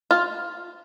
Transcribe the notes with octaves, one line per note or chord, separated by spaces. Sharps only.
F4